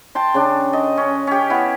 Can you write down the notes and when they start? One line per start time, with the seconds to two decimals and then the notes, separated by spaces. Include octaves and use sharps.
0.15 G5 A5 C6
0.34 C#3 D4
0.73 D#5
0.97 C#4
1.27 C#4 G4
1.50 B3 E4 F5